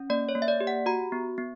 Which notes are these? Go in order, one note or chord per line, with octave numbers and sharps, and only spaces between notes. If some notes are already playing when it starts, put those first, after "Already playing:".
Already playing: C#4
A#3 D5
C#5
A#3
E5
D5
G4
F#5
F#4 A#5
B3
B3